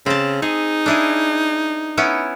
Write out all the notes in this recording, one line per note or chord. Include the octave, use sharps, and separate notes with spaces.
C#3 C4 A5
D#4 G#4
D4 E4 G#4
B3 C#4 E4